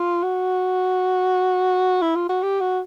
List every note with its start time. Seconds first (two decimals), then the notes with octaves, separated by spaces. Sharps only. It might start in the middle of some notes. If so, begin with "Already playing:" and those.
Already playing: F4
0.23 F#4
2.02 E4
2.15 F4
2.29 F#4
2.43 G4
2.61 F#4